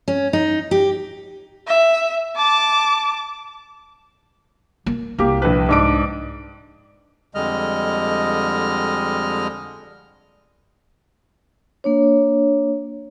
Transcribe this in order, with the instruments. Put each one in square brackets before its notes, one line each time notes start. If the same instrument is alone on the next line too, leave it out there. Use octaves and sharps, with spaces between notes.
[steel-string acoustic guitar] C#4
D#4
G4
[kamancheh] E5
A5 D6
[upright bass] A#3
[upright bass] C2 [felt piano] A#3 G4
[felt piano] A#1 B4
G#2 D4 D7
[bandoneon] F2 D3 G3 G#3 D#5 F6
[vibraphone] A#3 D4 C#5